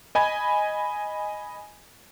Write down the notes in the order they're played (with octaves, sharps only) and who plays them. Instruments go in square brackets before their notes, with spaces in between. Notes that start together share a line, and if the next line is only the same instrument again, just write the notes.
[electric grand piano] D#5 G#5 B5 G#6